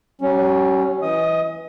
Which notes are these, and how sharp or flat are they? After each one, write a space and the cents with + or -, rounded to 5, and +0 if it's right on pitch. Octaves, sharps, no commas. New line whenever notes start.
G3 -45 C#4 +0
E3 +0 D#5 +30 D#6 +0